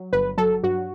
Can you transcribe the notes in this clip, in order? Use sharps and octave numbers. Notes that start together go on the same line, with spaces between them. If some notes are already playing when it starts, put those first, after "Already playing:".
Already playing: F#3
G1 B4
F#3 A4
G2 F#4